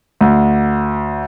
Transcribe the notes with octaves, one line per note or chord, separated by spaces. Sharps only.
D2